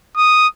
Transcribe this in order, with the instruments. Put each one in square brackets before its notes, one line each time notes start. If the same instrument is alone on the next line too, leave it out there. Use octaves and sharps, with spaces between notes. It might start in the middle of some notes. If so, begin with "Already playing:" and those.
[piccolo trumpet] D#6